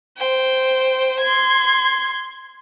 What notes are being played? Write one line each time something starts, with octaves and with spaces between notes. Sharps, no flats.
C5 G5
C6 G#6